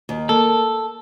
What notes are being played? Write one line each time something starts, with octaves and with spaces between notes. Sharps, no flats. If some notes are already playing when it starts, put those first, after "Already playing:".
D#2
A#3 A4